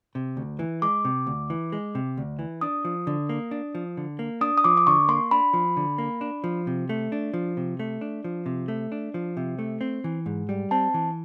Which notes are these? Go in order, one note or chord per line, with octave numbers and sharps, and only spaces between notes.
C3
D2
E3
G#3 D6
C3
D2
E3
G#3
C3
D2
E3
D4 D#6
F3
D3
A#3
D4
F3
D3
A#3
D4 D#6
D#6
F3 D6
D6
D3 C#6
A#3 C6
D4 B5
F3
D3
A#3
D4
F3
C3
A3
D4
F3
C3
A3
D4
F3
C3
A3
D4
F3
C3
A3
C4
E3
G#2
G3
C4 A5
E3